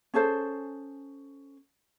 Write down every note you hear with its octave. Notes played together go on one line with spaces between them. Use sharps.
C#4 G#4 A4 C5